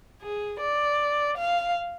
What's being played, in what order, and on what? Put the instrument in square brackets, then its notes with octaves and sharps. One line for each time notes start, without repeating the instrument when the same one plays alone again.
[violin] G#4
D5
F5